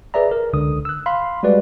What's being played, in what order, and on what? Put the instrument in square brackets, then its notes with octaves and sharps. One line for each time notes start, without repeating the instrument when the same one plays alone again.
[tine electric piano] G#4 B4 D5 E5 A#5
A#4
C#2 D3 D#6
E6 F#6
F5 B5 C6
G3 G#3 F#4 B4 D5